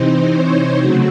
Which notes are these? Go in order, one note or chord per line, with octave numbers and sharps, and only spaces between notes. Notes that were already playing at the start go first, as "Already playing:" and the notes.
Already playing: C3 E3 C4 D#4 C5
C#5
C#3 F#3 A3 C4 F#4